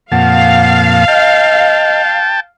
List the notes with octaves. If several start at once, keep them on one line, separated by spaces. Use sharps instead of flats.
F2 A#2 F5 F#5 A5
D#5 G5 A5